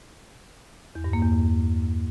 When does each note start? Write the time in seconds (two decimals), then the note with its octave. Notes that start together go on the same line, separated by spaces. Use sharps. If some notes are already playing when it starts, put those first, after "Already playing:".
0.95 E2
1.04 G2
1.13 A#3
1.22 E2